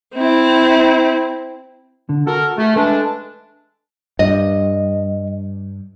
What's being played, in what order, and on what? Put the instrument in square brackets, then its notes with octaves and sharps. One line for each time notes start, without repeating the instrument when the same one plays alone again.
[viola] C4 E4
[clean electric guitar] D3
[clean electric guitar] F#4 [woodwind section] A4 A#4
[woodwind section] A3 [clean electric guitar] G#4
[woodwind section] G#3 D4 [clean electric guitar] A4 B4 E5
[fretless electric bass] G2 [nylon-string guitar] D#5